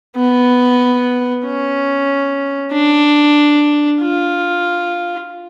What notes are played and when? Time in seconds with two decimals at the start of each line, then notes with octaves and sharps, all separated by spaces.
0.17 B3
1.45 C#4
2.73 D4
4.02 F4